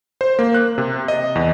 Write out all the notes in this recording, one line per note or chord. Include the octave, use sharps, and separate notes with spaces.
C5
A#3
F#6
C3
D#5
E2